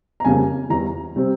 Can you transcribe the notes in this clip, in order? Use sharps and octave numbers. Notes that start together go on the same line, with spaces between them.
A#5
F2 C#3 G3 A#3 G#5
E2 E3 G3 A#5
C3 G3 C4